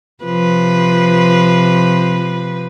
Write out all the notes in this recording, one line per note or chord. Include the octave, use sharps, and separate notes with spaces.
C3 F3 B4